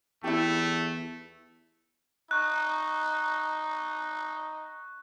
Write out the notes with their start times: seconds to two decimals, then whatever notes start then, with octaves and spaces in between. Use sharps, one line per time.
0.24 E2 A3 E4 G4
2.31 D#4 C#6 F#6